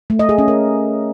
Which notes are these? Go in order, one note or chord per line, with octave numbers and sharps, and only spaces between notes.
A3
D#5
G#4
C#4
A#4